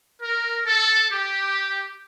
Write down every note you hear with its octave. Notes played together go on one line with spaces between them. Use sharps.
A#4
A4
G4